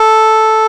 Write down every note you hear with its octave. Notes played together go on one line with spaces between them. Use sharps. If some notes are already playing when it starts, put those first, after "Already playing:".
Already playing: A4